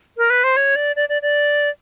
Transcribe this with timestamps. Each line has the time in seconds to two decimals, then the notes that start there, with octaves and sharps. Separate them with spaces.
0.17 A#4
0.30 B4
0.44 C5
0.56 C#5
0.76 D5
0.96 D5
1.09 D5
1.22 D5